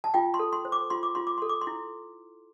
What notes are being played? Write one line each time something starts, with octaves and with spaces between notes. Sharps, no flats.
A5
F4 G5
C6
A4
C6
C5
D6
F4 C6
D6
F4 C6
D6
A4 C6
D6
C6
E4